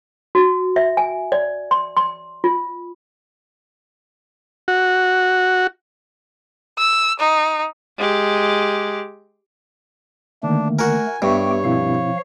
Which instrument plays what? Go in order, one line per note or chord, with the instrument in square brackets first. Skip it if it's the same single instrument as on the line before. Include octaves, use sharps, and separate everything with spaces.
[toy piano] F#4
E5
G#5
D5
C6
C6
F4
[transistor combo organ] F#4
[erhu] E6
D#4
[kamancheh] G#3 G4
[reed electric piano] D3 D#3 A#3 [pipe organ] A3 [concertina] D4
[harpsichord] F#4 A#4 [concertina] G#5
[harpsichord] G2 [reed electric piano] B3 E5 C#6 [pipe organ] G4 G5 [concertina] C#5
[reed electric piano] B2 C4 E4 [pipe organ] F3 F5